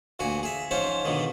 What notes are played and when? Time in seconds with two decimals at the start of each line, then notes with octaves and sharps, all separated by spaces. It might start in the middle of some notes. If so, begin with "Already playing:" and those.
0.19 D2 A#2 F#4 G#5
0.43 G#4 E5
0.71 G#2 F3 C#4 C5 C#5
1.05 G#2 B2 D3 D#3